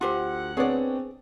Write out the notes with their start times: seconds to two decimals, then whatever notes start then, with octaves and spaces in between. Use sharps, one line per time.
0.01 D2 F4 G4 C5 F#5
0.57 B3 C4 D4 G#4 C#5 D5